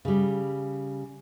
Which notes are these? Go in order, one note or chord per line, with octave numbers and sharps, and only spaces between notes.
C#3 G3